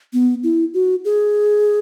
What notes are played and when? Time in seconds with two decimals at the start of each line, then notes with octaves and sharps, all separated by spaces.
0.13 B3
0.43 E4
0.74 F#4
1.05 G#4